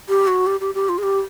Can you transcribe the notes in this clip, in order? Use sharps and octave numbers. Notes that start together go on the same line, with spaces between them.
G4
F#4
G4
G4
G4
F4
G#4
G4